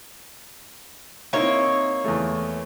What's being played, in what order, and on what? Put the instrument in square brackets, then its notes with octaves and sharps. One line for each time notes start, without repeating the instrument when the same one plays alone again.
[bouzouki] A#3 C#5 [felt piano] C4 D#4 E4
[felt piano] E2 A3